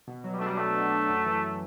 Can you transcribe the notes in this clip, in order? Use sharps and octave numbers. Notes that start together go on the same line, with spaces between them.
B2
F#3
G3
A3 D4
G3
A3 B3
B2
F#3
F#2
E3